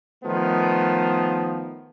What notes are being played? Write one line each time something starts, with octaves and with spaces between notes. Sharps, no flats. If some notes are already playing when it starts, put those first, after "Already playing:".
D#3 F3 A3 B3